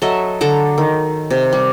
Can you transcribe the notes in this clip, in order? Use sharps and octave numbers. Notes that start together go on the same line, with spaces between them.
F#3 A4 D#5 E5
D3 A4 A#5
D#3
C3
G3